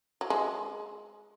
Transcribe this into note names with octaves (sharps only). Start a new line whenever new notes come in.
F#3
G#3